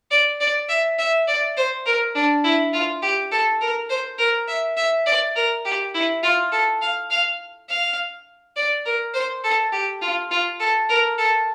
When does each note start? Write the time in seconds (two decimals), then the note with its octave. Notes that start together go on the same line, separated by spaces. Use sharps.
0.11 D5
0.40 D5
0.69 E5
0.99 E5
1.28 D5
1.57 C5
1.86 A#4
2.15 D4
2.44 E4
2.73 F4
3.02 G4
3.32 A4
3.61 A#4
3.90 C5
4.19 A#4
4.48 E5
4.77 E5
5.06 D5
5.36 A#4
5.65 G4
5.94 E4
6.23 F4
6.52 A4
6.81 F5
7.11 F5
7.69 F5
8.56 D5
8.86 A#4
9.14 C5
9.44 A4
9.72 G4
10.02 F4
10.31 F4
10.60 A4
10.89 A#4
11.18 A4